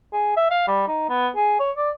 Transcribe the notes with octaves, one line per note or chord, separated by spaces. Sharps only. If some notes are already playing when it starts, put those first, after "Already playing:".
G#4
E5
F5
G3
D#4
B3
G#4
C#5
D5